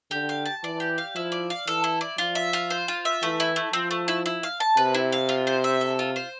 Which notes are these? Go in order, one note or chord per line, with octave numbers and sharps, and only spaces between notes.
D3 G4
F5
A5
E3 D5
G4
F5
F3 E4
D5
F5
E3 A4
E4
D5
F3 F4
E5
F4
C5
F4
E5
E3 A3
E4
A3
F3 C4
A3
E4
E4
F5
A5
C3 B4
E4
F5
F4
C5
E5
A4
F4
C5